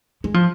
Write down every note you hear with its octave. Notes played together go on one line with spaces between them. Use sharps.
G#3
F3